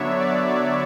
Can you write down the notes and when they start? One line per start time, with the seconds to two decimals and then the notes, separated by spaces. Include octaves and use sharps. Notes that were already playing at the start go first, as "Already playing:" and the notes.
Already playing: D3 F#3 B3 D4 C#5 E5
0.19 D5
0.48 D5